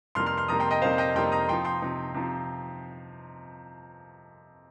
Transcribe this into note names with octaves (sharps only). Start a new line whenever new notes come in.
F2 C3 G3 A#3 D#4 C6 F6
C6 F6
C6 F6
F2 C3 G3 A#3 D#4 A#5 D#6
G5 C6
D#5 G5
F2 C3 G3 A#3 D#4 C5 F5
D#5 G5
F2 C3 G3 A#3 D#4 G5 C6
A#5 D#6
C3 F3 D#4 G5 C6
G5 C6
C3 F3 D#4
C3 F3 D#4